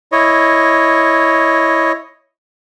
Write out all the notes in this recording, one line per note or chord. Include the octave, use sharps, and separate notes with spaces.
E4 C#5 D#5